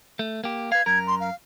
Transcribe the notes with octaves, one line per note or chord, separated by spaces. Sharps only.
A3
A#3 G4
B4 F5 G#6
F#2 A#4 G#6
C6
F5